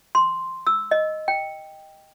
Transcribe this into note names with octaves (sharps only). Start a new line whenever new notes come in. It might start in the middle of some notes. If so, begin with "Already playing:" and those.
C6
E6
D#5
G5